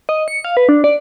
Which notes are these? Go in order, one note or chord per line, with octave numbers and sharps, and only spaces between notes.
D#5
C#7
F5
B4
D4
D5